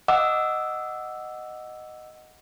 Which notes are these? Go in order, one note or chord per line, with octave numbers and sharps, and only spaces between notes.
D#5 F#5 D6 E6